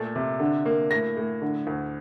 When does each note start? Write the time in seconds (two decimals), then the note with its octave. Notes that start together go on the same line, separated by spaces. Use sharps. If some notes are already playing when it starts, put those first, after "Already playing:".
Already playing: A#2 A3 A6
0.16 C3
0.40 D3
0.66 A#3
0.91 A2 A#6
1.17 A2
1.42 D3
1.67 D2